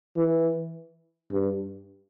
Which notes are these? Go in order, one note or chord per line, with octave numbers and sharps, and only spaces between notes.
E3
G2